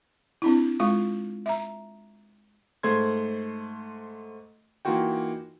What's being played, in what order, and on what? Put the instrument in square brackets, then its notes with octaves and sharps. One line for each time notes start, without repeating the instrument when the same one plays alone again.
[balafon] C4 D4 E4
G#3 F4 C#6
E5 A#5
[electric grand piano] G#2 A3 C5 C6 G#6
E3 A#3 D#4 F4 F#4 G5